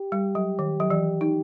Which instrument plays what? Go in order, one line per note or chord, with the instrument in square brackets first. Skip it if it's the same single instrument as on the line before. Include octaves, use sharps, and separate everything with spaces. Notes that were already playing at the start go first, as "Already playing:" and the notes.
Already playing: [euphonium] G4
[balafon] G3
F#3
D#3
F#3
E3
D#4